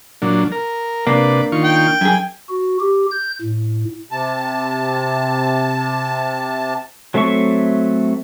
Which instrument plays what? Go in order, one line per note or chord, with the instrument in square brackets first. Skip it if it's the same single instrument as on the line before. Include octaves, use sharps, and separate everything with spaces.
[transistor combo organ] A#2 F#3 D4
A#4
[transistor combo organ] C3 B4 D5 [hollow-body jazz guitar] A#3 D4
[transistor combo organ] D#3 F4 C#6
[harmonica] G5
[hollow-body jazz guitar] F#2 G#4 [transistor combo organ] G#5
[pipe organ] F#4
G4
G6
A2
[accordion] C3 A5
[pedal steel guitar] F#3 A3 C4 E5 C#6